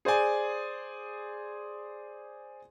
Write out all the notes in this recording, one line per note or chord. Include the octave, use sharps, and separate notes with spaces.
G#4 C5 D5 G#5